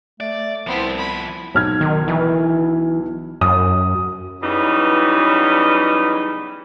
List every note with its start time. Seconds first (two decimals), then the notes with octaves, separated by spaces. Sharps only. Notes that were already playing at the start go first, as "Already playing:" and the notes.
0.20 A3 D5
0.67 C2 F3 B3 C4 E4
0.98 B5
1.54 B1 F6 G#6
1.81 D#3
2.08 E3
3.41 F#2 D#6
4.42 C#3 E3 F#3 G3 B3 D#4